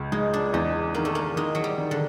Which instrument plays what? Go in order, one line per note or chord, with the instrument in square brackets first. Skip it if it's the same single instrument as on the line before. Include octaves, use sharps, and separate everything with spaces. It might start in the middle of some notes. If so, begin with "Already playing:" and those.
Already playing: [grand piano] C#2
[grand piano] G#3 [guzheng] D#4
[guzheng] D4
[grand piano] E2 [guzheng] D#4
[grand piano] D#3 [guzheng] A#3
[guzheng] A3
A#3
[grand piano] D#3 [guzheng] G#3
[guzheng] F#3
G3
[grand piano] D#3
[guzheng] D3